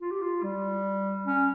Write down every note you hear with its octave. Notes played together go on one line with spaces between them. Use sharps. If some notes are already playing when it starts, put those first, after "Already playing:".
F4
G4
F4
G3
C#4